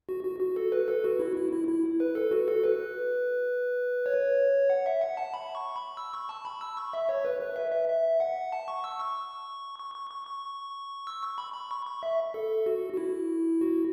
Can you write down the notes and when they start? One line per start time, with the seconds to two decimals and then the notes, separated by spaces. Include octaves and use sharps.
0.09 F#4
0.24 F#4
0.40 F#4
0.56 A4
0.72 B4
0.88 A4
1.04 F#4
1.19 E4
1.36 E4
1.52 E4
1.68 E4
2.00 B4
2.15 A4
2.31 F#4
2.48 A4
2.64 B4
4.06 C#5
4.70 F#5
4.86 E5
5.01 F#5
5.17 A5
5.34 B5
5.55 C#6
5.76 B5
5.97 E6
6.13 C#6
6.29 A5
6.45 B5
6.61 E6
6.77 C#6
6.93 E5
7.09 C#5
7.25 B4
7.41 B4
7.56 E5
7.72 E5
7.89 E5
8.20 F#5
8.52 A5
8.68 C#6
8.84 E6
8.99 C#6
9.79 C#6
9.95 C#6
10.11 C#6
10.27 C#6
11.07 E6
11.23 C#6
11.38 B5
11.54 B5
11.71 C#6
11.86 C#6
12.03 E5
12.34 A4
12.66 F#4
12.93 F#4
12.97 E4
13.61 F#4